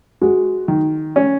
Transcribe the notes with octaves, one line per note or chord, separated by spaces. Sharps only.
G#3 F#4
D#3
C#4